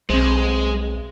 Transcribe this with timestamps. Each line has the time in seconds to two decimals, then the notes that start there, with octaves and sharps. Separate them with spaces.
0.10 B1 G#3 C4 C5